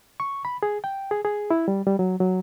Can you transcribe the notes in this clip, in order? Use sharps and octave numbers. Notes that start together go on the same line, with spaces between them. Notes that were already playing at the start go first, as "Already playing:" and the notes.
C#6
B5
G#4
G5
G#4
G#4
E4
G3
G3
F#3
F#3